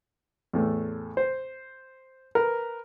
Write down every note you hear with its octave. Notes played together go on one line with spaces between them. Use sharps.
E2 A2 A3
C5
A#4 B4